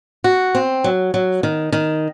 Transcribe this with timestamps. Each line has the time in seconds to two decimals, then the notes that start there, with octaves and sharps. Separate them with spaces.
0.24 F#4
0.55 C4
0.84 F#3
1.14 F#3
1.43 D#3
1.72 D#3